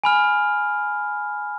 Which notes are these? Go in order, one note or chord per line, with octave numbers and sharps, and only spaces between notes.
G#5 B5 F6